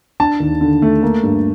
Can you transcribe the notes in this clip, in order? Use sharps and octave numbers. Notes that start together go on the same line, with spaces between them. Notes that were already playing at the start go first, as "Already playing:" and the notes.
D4 A5
D#2
D3
A3
A#3
G2